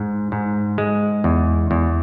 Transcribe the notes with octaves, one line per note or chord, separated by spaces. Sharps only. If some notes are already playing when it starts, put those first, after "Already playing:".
Already playing: G#2
G#2
G#3
E2
E2